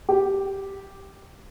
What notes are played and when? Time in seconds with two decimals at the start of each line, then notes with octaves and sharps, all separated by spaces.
0.09 G4